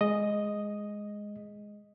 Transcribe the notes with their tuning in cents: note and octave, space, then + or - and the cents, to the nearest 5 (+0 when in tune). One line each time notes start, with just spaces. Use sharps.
G#3 +0 D#5 +0